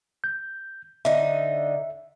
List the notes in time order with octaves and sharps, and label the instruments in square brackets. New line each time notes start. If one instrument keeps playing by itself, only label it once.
[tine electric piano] G6
[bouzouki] D3 D#4 [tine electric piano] E5